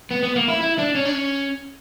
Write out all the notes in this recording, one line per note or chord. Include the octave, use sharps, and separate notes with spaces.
B3
B3
A#3
E4
E4
D4
C#4
D4
C#4